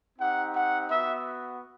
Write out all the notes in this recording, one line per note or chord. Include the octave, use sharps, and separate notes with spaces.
C4 D#4 G4 F#5
F#5
B3 F#4 E5